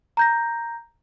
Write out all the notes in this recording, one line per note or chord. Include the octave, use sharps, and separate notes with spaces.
A#5 G6 A#6